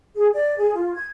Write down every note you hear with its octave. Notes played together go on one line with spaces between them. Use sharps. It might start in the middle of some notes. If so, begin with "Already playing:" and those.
G#4
D5
G#4
F4
G#6